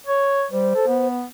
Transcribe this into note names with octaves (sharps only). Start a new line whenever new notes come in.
C#5
G3 C5
A4
B3